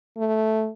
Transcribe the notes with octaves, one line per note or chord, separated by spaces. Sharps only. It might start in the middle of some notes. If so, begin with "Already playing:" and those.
A3